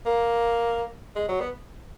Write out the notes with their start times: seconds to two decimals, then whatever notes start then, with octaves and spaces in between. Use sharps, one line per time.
0.06 A#3
1.16 G#3
1.28 F#3
1.40 B3